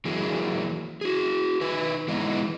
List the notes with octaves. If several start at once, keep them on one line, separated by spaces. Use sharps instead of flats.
E3 F#3 A#3 G#4
F#4 G#4
D#4 B4 G#5
E3 G#3 B3 D#4 E4